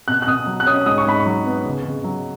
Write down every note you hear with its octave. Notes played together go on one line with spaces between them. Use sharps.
B2 F#6
F#6
B2 D#6
F#3
F#6
C#4 D#6
G#2 D#6
C#6
G#2 B5
C#6
F#3
B3
C#3
C#3
F#3